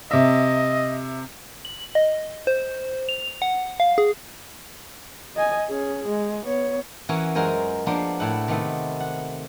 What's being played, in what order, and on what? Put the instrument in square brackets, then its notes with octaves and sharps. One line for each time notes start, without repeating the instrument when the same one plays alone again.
[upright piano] C3 E5 [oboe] D#5
[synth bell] F#7
D#5
C5
F7
F#5
F5
G#4
[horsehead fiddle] D#5 G#5
C#4 G#4
G#3
B3 C#5
[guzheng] E3 C#4 F#4 A#4 C#5
F#2 G#3 F4 A#4 C5 G#5
F3 A#3 B3 D4 A#4 C6
A2 E4 F#5
C3 D#3 A3 B3 B4
F#5